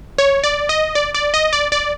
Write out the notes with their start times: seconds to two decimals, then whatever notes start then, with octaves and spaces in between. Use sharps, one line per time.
0.18 C#5
0.44 D5
0.69 D#5
0.95 D5
1.14 D5
1.34 D#5
1.53 D5
1.72 D5